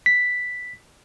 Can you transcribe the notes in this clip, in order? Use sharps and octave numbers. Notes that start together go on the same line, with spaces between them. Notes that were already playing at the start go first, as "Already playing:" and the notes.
B6